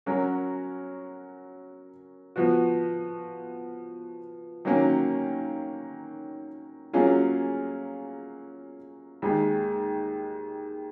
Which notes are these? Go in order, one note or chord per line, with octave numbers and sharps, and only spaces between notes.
F#3 C#4 F#4 A#4 C#5
F3 B3 F#4
D#3 F#3 A#3 C#4
F#3 A#3 C#4 F4 G#4
D#2 D#3 G#3